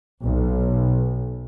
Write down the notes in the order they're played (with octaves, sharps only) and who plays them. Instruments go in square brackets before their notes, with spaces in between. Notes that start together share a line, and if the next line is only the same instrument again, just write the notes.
[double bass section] B1